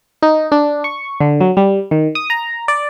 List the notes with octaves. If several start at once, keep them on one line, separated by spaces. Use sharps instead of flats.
D#4
D4
C#6
D3
F#3
G3
D#3
D#6
A#5
D5